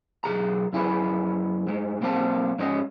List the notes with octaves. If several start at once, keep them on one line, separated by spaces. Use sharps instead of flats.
B1 C#3 G#4 A#5
F#2 E4 G#4 B4
G2 G#3
B1 A#3 C4 F5 A5
G#2 G#3 C#4 D#5